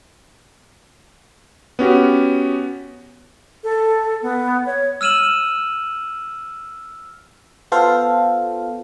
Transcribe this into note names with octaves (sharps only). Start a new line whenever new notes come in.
B3 C#4 F#4 G4
A4
B3
C#5
E6 F6 D#7 E7 F#7
B3 F4 A4 C5 F5